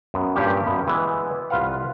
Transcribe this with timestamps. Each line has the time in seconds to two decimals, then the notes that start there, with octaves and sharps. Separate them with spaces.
0.14 F#2 B3
0.36 G2 A#2 C#4 G4
0.67 F#2 B3
0.87 E3 G#3 B3
1.50 C2 F4 B4 F5 F#5